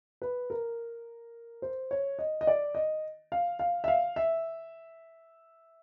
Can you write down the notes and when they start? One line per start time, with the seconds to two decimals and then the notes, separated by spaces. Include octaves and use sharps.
0.22 B4
0.50 A#4
1.62 C5
1.91 C#5
2.19 D#5
2.41 D#5
2.47 D5
2.75 D#5
3.32 F5
3.59 F5
3.84 E5
3.88 F5
4.16 E5